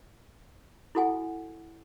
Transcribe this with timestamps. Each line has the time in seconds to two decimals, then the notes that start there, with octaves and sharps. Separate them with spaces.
0.95 E4 F#4 A4 F#5 G#5